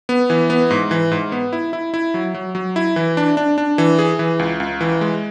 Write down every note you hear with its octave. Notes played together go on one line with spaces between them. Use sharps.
B3
E3
B3
G#2
E3
G#2
B3
E4
E4
E4
F#3
F#3
F#3
E4
E3
D4
D4
D4
E3
G#4
E3
C#2
C#2
E3
G#3